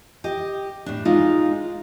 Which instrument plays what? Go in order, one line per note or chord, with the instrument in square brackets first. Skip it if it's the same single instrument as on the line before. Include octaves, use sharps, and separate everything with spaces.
[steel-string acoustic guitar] G4 D#5
A2 D4
G#3 D#4 F4